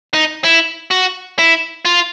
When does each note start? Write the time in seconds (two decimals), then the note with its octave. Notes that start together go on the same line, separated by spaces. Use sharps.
0.14 D#4
0.44 E4
0.91 F#4
1.39 E4
1.85 F4